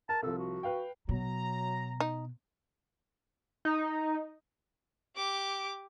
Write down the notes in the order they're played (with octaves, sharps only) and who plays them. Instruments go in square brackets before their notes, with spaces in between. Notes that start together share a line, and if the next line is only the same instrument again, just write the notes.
[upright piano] A#4 [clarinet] A5
[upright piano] C2 F3 [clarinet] A4
[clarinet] F#4
[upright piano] B4 F5 G5
[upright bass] B2 [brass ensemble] F#3 A#5
[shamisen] D#4
[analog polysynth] D#4
[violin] G4 D6